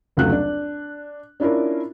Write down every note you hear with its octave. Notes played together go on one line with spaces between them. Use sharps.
F1 C#2 F#3 A3 F#6
D4
C#4 D4 E4 F4 A#4